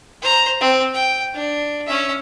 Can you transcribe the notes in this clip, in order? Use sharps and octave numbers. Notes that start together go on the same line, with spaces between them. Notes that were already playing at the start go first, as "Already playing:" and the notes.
C5 A#5
C4
G5
D4
C#4 E5